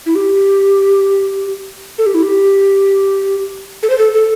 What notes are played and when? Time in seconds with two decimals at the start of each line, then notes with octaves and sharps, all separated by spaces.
0.06 E4
0.15 G4
1.98 A4
2.06 G4
2.15 E4
2.23 G4
3.83 A4
3.90 C5
3.98 A4
4.14 A4